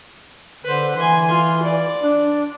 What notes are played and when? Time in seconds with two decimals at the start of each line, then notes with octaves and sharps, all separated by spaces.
0.64 D3 B4 C5
0.96 E3 G#5 C6
1.27 F4 C6
1.62 D5
2.02 D4